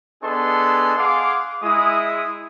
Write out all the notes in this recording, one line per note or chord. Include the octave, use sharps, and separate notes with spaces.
B3 D4 G#4 A4 D#5 C6
G#4 F5 F#5 C6 D6
G#3 E4 D#6